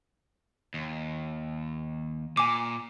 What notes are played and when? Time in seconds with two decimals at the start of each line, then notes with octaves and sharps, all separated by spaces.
0.74 D#2
2.37 A#2 G#5 D6